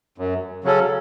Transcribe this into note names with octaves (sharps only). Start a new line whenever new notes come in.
F#2
C#3 F#3 C#4 A4